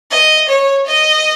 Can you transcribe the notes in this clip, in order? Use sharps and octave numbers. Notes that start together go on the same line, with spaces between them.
D#5
C#5
D#5